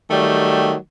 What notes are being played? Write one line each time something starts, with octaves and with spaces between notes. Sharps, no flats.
D#3 F#3 G3 A3